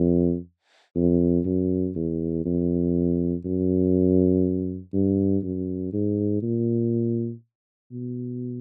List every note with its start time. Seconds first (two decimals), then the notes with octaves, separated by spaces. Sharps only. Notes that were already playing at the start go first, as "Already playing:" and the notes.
Already playing: F2
0.96 F2
1.46 F#2
1.96 E2
2.45 F2
3.45 F#2
4.94 G2
5.44 F#2
5.93 G#2
6.43 A#2
7.92 B2